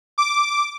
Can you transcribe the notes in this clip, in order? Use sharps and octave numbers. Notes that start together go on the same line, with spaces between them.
D6